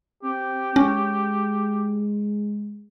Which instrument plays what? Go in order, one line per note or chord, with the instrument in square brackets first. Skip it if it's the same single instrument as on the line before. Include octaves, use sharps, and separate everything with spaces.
[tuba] C4 [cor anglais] G4
[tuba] G#3 [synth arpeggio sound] C#4